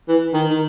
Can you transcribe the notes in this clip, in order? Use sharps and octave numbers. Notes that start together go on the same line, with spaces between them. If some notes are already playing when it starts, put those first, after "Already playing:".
E3
D#3
D#3